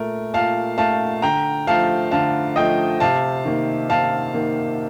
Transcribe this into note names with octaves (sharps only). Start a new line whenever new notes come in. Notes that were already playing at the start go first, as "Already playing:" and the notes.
Already playing: A#2 A3 A#4
A#2 F5 A5
A3 F5 A5
D3 G5 A#5
F3 A3 F5 A5
D3 F5 A5
F3 A3 D#5 G5
C3 F5 A5
D#3 A#3
C3 F5 A5
D#3 A#3